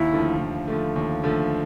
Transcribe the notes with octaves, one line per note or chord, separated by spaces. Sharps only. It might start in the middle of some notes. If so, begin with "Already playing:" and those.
Already playing: D#2 E4
D3 F3 A3
D#2
D3 F3 A3
D#2
D3 F3 A3